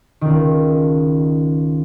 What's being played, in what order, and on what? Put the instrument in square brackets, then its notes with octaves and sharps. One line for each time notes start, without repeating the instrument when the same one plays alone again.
[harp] C#2 D#3